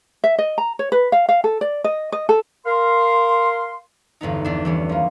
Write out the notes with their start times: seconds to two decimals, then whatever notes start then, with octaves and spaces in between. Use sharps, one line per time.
0.24 E5
0.38 D#5
0.58 A#5
0.79 C#5
0.92 B4
1.12 F5
1.29 F5
1.44 A4
1.61 D5
1.84 D#5
2.12 D#5
2.29 A4
2.65 A#4 F5 C6
4.21 G1 E2 B3 D#4
4.45 E2 D4
4.65 E3 G3 C#4
4.89 F3 A#3